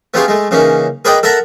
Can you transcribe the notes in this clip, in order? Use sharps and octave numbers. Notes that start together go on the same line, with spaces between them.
A3 B3 C#4 F4 G4 G#4
G#3 A3
C#3 E3 A#3 C#4 D#4
G#4 A#4 B4 D5 D#5 G5
A4 A#4 E5 F#5 A5 A#5